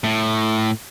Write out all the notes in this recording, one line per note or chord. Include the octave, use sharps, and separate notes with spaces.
A2